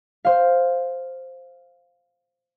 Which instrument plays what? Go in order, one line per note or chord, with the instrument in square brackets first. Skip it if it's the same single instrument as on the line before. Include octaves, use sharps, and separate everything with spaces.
[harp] C5 F5